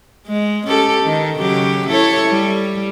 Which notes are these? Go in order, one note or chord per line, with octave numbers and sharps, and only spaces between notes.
G#3
C#4 G4 A4
D#3
C#3 F#3 G4
E4 A4 C#5
G3